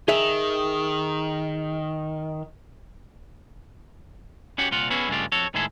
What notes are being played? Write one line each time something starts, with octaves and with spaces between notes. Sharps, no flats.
D#3 G#4 E5
C#4 F#4 G4 C#5 F#5
C2 A#2 F4 F#5
B3 C#4 E4 F#4 G#4 B4
G2 C#3 G#3 A3 F4 G4
F2 F#4 A4 C#5
A2 D#3 G#3 E4 G#4 A4